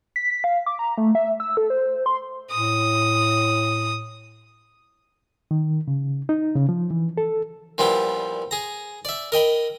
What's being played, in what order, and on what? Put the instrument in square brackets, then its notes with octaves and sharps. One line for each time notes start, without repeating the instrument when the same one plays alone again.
[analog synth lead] B6
F5
D6
A#5
A3
E5
E6
A4
C5
C6
[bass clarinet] A2 [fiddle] D#6
[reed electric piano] D#3
C#3
D#4
C#3
F3
E3
A4
[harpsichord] A#2 F3 G3 B3 E4
G#4 A#5
D5 E5
A#4 D#5 G5 B5